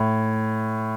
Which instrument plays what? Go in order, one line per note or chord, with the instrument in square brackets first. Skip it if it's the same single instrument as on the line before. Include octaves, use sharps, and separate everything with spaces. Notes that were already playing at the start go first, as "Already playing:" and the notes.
Already playing: [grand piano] A2